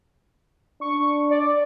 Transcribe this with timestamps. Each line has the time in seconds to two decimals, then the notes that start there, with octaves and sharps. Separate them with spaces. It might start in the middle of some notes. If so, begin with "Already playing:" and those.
0.81 D4 C#6
1.31 D5